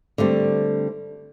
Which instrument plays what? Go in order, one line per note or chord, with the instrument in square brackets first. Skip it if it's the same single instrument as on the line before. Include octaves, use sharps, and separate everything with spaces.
[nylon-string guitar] D3 G3 A3 C4